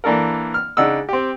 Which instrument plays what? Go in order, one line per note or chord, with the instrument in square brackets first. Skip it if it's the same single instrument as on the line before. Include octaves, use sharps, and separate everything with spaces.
[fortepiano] E3 A#3 D4 A4 A#4
F6
C#3 D4 D#4 F#5 E6
C4 G4